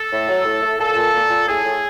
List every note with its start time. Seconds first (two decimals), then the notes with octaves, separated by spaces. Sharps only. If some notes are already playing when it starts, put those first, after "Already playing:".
Already playing: A4
0.10 A2
0.28 F#3
0.46 A2
0.63 A3
0.79 A#2 A4
0.96 A#2
1.14 A#2
1.30 A#2
1.48 A2 G#4
1.64 A2